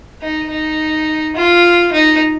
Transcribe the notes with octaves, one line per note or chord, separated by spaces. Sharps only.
D#4
D#4
F4
D#4